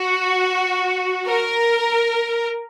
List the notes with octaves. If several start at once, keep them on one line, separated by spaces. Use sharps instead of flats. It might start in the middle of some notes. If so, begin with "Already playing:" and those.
Already playing: F#4
A#4